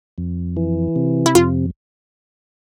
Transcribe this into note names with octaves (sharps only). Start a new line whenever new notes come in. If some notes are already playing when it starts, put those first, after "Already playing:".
F2
E3
C3
E4
F2 F4